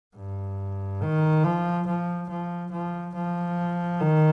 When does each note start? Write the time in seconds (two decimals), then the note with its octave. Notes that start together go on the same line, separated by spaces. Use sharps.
0.16 G2
1.02 D#3
1.44 F3
1.87 F3
2.29 F3
2.72 F3
3.15 F3
4.00 D#3